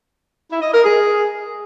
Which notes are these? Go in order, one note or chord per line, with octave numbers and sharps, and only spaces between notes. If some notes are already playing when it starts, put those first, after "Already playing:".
E4
D#5
A#4
G#4